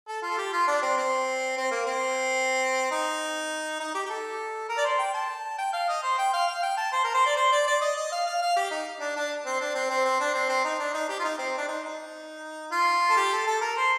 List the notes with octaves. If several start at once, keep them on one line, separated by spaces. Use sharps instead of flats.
A4
F4
A4
G4
F4
D4
C4
C4
C4
A#3
C4
D#4
D#4
G4
G4
A4
A#4
D5
C5
G5
A5
G5
F5
D#5
C5
G5
F5
F5
G5
A5
C5
A#4
C5
D5
C5
D5
D5
D#5
D#5
F5
F5
F5
G4
D#4
D4
D4
C4
D4
C4
C4
C4
D4
C4
C4
D#4
D4
D#4
G4
F4
D#4
C4
D4
D#4
D#4
F4
A4
G4
A4
A4
A#4
C5